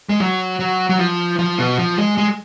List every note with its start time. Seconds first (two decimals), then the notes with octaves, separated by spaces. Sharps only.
0.09 G#3
0.20 F#3
0.60 F#3
0.90 F#3
0.99 F3
1.39 F3
1.59 B2
1.78 F3
1.98 G#3
2.18 G#3